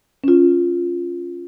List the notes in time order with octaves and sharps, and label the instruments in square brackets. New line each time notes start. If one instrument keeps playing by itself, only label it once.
[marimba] C#4 F4